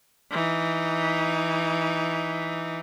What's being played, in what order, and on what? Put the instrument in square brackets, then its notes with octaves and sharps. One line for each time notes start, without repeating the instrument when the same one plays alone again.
[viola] E3 D#4